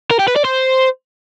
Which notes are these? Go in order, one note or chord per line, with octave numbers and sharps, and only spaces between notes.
A#4
G4
B4
D5
C5